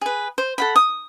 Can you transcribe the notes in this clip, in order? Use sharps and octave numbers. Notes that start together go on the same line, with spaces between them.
G#4 B4
C5
A4 F#5 B5
D#6